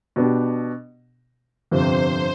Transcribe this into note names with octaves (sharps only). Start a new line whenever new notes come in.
B2 B3 D4 G4
G1 F2 C3 C5